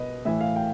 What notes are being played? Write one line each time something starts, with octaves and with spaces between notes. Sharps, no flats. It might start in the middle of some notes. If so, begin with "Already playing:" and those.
Already playing: B2 B4 D#5
A2 E3 E5
F5
G5